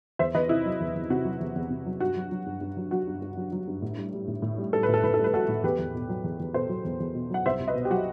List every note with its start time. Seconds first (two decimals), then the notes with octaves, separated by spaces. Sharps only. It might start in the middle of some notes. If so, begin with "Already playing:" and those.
0.19 E2 C5 E5
0.34 E2 B4 D#5
0.49 C3 E4
0.65 F#3
0.80 E2
0.95 E2
1.10 C3 F#4
1.25 F#3
1.40 E2
1.56 E2
1.70 C3
1.86 F#3
2.00 G2 F#4
2.16 F#3
2.32 F#3
2.46 G2
2.61 G2
2.77 F#3
2.91 F#3 F#4
3.07 G2
3.22 G2
3.37 F#3
3.52 F#3
3.67 G2
3.82 A2
3.98 G3
4.13 G3
4.28 A2
4.42 A2
4.58 G3
4.73 G3 A4
4.83 B4
4.88 A2
4.94 A4
5.03 A2 B4
5.14 A4
5.19 G3
5.24 B4
5.33 G3 F#4 A4
5.48 A2
5.64 E2 G4 B4
5.78 E2
5.94 B2
6.09 F#3
6.24 E2
6.40 E2
6.54 B2 A4 C5
6.69 F#3
6.85 E2
7.00 E2
7.15 B2
7.30 F#3 F#5
7.46 C2 C5 E5
7.60 C2
7.67 B4 D#5
7.75 B2
7.85 G4
7.90 F#3 F#4